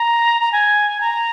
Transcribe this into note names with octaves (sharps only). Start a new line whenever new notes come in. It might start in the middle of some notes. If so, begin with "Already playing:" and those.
Already playing: A#5
A#5
G#5
A#5